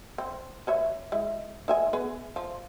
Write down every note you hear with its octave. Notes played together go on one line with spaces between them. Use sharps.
C4
B4 C#5 E5
G#3 E4
D#4 E5 G#5
B3 G#4 B4
F3